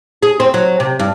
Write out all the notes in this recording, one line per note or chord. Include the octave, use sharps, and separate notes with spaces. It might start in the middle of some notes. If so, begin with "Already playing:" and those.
G#4
C4
F#3
C3
G2